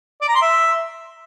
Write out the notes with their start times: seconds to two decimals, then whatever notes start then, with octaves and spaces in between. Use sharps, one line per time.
0.22 D5
0.28 A#5
0.35 C6
0.42 E5